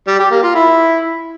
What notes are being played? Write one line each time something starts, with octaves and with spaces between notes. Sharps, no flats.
G3
G4
A#3
F4
E4